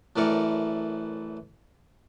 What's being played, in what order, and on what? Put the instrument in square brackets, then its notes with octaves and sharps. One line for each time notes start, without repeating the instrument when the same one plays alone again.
[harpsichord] F#2 A2 E3 A#4 D5 C#6